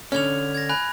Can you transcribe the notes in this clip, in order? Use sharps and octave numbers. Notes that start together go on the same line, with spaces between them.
D3 C#4 F6 G#6 F7
G#6 A#6
G#5 B5 F#6